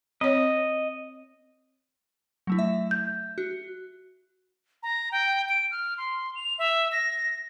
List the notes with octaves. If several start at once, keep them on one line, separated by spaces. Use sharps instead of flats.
C4 C#5 D#5
F#3 A3 E4
E5
G6
F#4
A#5
G5
D7
F6
C6
F7
E5
A#6